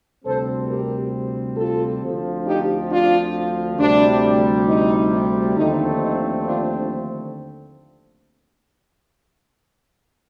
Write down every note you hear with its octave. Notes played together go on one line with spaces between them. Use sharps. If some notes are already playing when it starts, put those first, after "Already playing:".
D2 C3 G3 C4 A4 C5
G4 A#4
F4 A4
D2 D3 F3 C4
D#4 G4
D4 F4
D2 C3 G3 D4
D#4
D#2 D3 F3 A3 C4 D#4
D#4
D4 F4